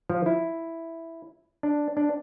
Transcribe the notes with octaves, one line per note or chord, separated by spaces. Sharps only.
F3
E4
D4
D4